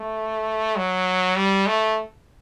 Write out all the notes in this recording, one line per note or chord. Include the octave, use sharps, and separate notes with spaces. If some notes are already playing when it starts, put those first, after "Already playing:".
Already playing: A3
F#3
G3
A3